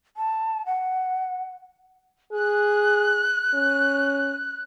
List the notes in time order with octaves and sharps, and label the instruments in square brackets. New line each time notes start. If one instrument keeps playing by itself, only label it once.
[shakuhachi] A5
F#5
[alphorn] G#4 [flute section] F#6
[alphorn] C#4